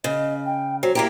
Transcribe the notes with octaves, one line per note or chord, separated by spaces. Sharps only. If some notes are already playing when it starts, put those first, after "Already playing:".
C#3 D#5
G5
F#3 C5
A#3 E4 G4 A#5